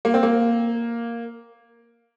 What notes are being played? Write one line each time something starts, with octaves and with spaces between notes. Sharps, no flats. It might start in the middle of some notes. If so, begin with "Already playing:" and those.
A#3
C4
A#3